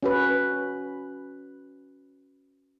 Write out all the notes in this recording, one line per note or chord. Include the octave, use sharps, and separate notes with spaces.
C#4 F#4 B4